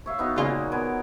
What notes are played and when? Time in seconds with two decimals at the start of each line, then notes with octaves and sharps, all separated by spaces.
0.06 C#5 E5 F5
0.19 B3 D#4 F#4
0.36 A#2 C#3 G#3 A#3 F4
0.72 B3 A#4 G#5